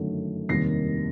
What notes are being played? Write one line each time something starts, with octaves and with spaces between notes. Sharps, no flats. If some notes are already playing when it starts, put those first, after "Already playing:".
Already playing: G1 F#2 D#3 F#3 A3
F1 D#2 D#3 G3 A#3 A#6 C7